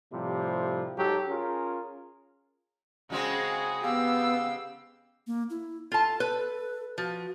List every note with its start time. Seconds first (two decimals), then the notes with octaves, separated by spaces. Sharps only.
0.13 A2 C3 F3 G3
0.97 G#2 F#3 G4 A4
1.28 C#4 F4 G#4 A#4
3.10 C#3 G#3 C4 F#4 G#4
3.83 B3 G4 F5 E6
5.27 A#3
5.50 E4
5.92 F4 A4 A5
6.20 B4
6.98 F3 F#4